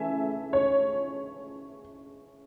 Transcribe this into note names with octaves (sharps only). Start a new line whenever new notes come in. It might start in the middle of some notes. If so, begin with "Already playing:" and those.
Already playing: C#3 E3 A3 E5 G#5
C#5